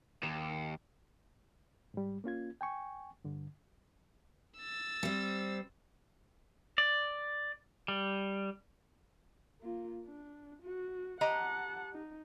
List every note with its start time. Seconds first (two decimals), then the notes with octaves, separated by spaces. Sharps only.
0.23 D#2
1.94 G#2 G3
2.24 A#3 C#4 F4 G#6
2.61 G5 G#5 C#6
3.24 G2 D3
4.58 E6 A6
5.03 G3 C4
6.78 D5
7.88 G3
9.62 A#3 F4
10.05 D4
10.63 F#4
11.21 G4 D#5 F#5 A5 A#5
11.93 D#4